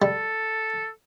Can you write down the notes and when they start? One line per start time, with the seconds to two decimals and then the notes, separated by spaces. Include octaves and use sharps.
0.02 G3 A4